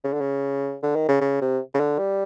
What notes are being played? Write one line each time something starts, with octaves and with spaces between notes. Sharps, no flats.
C#3
D3
C#3
D3
D#3
C#3
C#3
C3
C#3
D3
G3